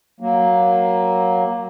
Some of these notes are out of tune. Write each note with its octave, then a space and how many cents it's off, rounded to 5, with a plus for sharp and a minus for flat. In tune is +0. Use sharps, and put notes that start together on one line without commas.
F#3 +0 A#3 +5